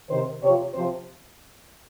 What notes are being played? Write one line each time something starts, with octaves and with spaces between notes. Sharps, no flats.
C3 D#3 C5
C3 F3 C#5
C3 F3 C5